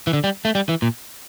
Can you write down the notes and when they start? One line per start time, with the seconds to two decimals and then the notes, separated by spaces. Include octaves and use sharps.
0.07 E3
0.13 D3
0.24 G3
0.45 A3
0.55 G3
0.69 E3
0.82 A#2